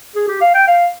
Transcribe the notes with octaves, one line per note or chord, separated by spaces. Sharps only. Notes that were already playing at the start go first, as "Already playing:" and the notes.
G#4
G4
F5
G5
F5